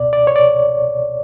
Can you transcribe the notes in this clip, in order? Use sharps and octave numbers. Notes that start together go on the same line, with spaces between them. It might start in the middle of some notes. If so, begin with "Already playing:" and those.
Already playing: C#2 B2 D5
D5
C#5
D5